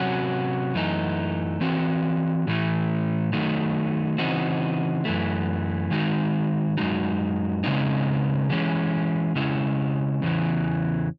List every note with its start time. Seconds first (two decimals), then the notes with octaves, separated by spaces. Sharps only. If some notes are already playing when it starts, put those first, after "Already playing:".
Already playing: C3 F#3 C#4 F#4
0.75 F#2 E3 A3 D#4
1.61 E3 C4 F#4
2.47 A2 E3 A3
3.33 D#3 F#3 A3 D#4
4.18 C#3 E3 C4 D#4 F#4
5.05 F#2 E3 A3
5.91 D#3 G#3 D#4 F#4
6.78 F#2 D#3 G#3 D#4 F#4
7.64 C#3 G#3 C4 D#4
8.50 E3 G#3 C#4
9.35 C#3 G#3 C#4 E4
10.22 E2 C#3 E3